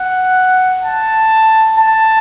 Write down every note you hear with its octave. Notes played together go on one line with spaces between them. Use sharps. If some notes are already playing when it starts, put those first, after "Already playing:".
Already playing: F#5
A5
A5